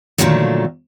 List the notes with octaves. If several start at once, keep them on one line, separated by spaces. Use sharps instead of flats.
A#2 D3 D#3 F3 F#3 A3